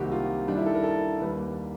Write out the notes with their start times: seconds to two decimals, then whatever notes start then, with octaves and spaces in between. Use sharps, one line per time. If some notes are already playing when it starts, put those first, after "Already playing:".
Already playing: C2 C3 D#3 F#3 A#3 F#4 G4
0.12 F4
0.48 G2 D#3 G3 D4
0.57 E4
0.66 A4
0.75 A#4
0.83 A4
1.20 D#2 D#3 G3 A#3 B4